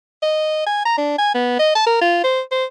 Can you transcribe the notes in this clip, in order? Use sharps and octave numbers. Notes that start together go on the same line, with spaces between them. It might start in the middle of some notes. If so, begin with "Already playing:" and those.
D#5
G#5
A#5
D4
G#5
B3
D#5
A5
A#4
F4
C5
C5